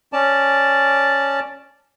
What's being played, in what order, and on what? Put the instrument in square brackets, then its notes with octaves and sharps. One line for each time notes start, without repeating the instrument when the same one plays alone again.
[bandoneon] C#4 D5 A5